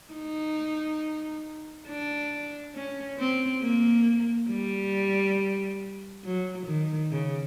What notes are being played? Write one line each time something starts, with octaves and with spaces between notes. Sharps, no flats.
D#4
D4
C#4
C4
A#3
G3
F#3
D#3
C#3